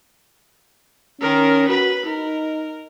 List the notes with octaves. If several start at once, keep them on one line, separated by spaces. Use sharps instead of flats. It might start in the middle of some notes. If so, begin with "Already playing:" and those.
D#3 C#4 A#4
F#4 B4 B5
D#4 A#4